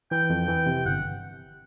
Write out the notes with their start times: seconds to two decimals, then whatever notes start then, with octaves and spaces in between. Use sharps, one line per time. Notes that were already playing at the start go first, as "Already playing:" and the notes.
0.11 E3 G5
0.30 F2
0.48 E3
0.66 C3
0.85 G1 F#5